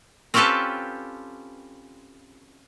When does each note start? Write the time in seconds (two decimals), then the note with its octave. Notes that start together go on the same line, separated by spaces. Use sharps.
0.34 C4 C#4 F4 G4 A4 B4